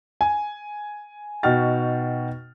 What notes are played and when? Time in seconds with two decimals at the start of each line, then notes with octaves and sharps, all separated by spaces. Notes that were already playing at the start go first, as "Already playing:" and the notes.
0.21 G#5
1.43 B2 D#4 F#4 G5 F6 A6